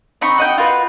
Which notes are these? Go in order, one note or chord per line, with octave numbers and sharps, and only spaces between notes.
C4 D#4 B5 C#6
F#4 D#5 G5
F4 F#4 B4